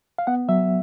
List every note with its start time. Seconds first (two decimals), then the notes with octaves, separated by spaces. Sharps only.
0.18 F5
0.27 B3 F#5
0.49 F#3 E5